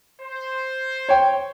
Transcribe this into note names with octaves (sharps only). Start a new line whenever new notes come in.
C5
C#5 G5